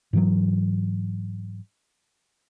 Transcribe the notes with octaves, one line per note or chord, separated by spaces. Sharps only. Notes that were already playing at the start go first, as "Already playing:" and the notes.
G#2 E3 F#3